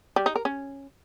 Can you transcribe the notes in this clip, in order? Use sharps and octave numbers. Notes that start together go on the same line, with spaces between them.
G3
D#4
A#4
C#4